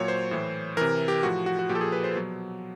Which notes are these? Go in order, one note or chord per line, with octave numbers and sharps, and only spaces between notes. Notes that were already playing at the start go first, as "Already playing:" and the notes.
Already playing: A#2 F#3 C#5
C5
A2 E3
C3 E3 A#4
G4
A2 F3 F#4
F#4
F#4
A#2 F3 G4 A4
G#4
B4
C5
B2 F#3